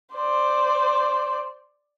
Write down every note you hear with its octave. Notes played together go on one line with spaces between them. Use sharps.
C5 D5